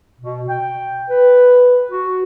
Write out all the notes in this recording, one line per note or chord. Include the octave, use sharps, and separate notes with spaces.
B2
G5
B4
F#4